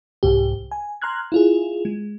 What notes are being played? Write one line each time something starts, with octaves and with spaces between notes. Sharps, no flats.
C2 G#2 G4
G#5
A#5 C6 F6 F#6 G#6
E4 F4 G#4
G#3